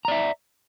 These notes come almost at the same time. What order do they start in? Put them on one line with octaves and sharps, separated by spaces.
A#5 D5 E5